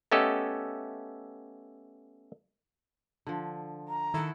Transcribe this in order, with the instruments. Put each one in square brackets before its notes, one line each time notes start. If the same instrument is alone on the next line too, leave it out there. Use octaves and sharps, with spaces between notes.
[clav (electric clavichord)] A3 B3 C#4 G4 A4 D#5
[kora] D3 F3
[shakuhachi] A#5
[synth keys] D#3 A4 [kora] E4 F#5